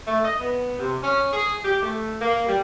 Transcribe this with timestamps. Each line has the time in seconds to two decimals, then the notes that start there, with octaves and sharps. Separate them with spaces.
0.06 A3
0.24 D#5
0.39 B3
0.78 C3
1.02 C#4
1.33 G#4
1.64 G4
1.82 A3
2.20 A#3
2.46 G3